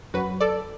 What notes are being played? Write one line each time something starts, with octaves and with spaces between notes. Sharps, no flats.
F#2 F#3 F#4 B4
A4 D5